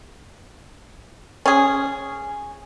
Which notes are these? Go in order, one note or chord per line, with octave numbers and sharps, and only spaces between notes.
C#4 G#4